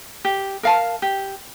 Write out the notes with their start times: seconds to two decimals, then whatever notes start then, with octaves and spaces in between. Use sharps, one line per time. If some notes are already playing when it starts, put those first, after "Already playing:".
0.25 G4
0.63 A#4 F5 A5
1.02 G4